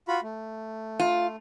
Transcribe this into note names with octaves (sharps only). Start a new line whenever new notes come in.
F4 F#4 B5
A3
F4